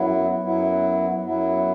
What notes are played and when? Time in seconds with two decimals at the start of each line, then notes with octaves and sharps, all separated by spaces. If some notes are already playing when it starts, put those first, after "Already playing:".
Already playing: F#2 F#3 B3 E4
0.43 F#2 F#3 B3 E4
1.22 F#2 F#3 B3 E4